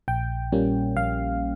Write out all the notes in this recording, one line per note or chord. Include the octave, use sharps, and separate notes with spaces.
A#1 G5
A#2 G3 A#3 C#4
A#1 F5